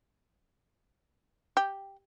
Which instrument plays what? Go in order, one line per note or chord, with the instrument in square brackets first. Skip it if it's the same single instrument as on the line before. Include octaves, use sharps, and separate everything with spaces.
[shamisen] G4